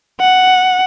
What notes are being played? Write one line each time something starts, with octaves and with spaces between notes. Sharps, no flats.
F#5